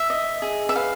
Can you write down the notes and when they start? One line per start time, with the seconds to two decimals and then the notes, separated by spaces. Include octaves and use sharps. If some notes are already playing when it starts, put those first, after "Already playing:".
Already playing: E5
0.10 D#5
0.42 G#4
0.69 E5
0.76 B4 F5